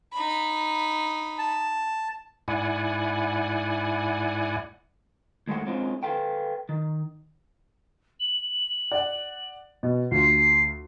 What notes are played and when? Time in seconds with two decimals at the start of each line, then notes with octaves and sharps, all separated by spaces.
0.13 D#4 B5
1.39 A5
2.48 G#2 E4 D5 F#5 G#5
5.48 D#2 G#3 A3 F#5
5.66 G#3 C4 C#4 F4
6.03 A4 B4 F5 G5
6.69 D#3
8.20 F#7
8.92 D5 F#5
9.83 B2
10.11 D2 F4 C7